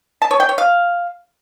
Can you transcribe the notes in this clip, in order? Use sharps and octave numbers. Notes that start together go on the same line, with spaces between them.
A5
C#5
G5
C#5
F5